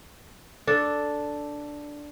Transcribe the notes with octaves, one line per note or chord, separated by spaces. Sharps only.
D4 A4